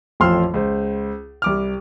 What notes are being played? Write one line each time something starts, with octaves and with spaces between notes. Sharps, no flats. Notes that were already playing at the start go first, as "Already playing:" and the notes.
A1 F2 F3 C6 E6 F6
C#2 C5
C2 D6 F6